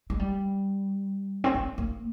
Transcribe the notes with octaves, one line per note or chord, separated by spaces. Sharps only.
G#3
G3
C4
A#3
A#3